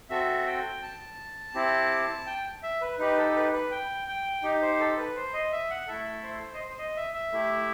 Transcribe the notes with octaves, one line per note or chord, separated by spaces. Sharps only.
C4 F#4 A4 E5
G5
A5
C4 E4 G4
G5
E5
B4
D#4 G4 B4
A4
B4
B4
G5
G5
D#4 G4
C5
A4
B4
C5
D#5
E5
F#5
A3 E4 A4 E5
C5
D#5
C5
C5
D#5
E5
E5
A3 E4 G4